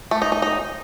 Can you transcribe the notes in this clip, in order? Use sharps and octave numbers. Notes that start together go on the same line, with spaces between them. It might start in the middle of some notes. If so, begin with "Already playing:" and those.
A3
D#4
D#4
D#4